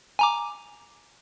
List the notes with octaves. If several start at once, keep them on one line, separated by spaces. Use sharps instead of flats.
G#5 A#5 D6